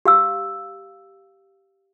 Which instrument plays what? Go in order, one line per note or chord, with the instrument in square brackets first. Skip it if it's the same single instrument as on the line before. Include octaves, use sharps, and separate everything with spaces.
[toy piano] G4 F5 E6